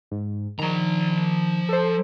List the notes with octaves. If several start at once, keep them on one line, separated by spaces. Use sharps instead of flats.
G#2
D#3 F3 A#5
A4 C5